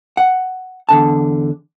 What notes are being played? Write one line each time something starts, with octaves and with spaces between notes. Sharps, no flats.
F#5
E2 D3 A5